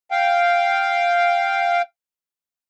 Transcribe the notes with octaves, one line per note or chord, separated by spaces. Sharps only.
F5 G5